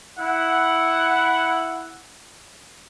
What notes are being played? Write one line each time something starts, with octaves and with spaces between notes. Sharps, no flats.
E4 F#5